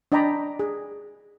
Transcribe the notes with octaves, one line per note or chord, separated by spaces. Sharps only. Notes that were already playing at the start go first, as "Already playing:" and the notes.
D4 D5 D#5 G5 A#5 B5
G#4